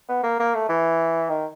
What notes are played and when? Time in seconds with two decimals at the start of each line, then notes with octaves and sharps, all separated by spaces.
0.09 B3
0.23 A#3
0.39 A#3
0.55 A3
0.69 E3
1.29 D#3